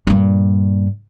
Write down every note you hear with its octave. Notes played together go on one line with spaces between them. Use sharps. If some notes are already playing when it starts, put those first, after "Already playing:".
G2 A#2